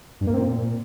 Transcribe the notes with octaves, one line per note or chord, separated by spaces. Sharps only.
G2
A#3
C4
A#2